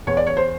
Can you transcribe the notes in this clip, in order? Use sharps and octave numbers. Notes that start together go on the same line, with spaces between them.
E2 C#5
D5
C#5
C5